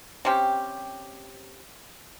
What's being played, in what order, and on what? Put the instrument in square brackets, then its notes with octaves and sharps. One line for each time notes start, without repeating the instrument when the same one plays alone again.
[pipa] C3 C4 C#4 G4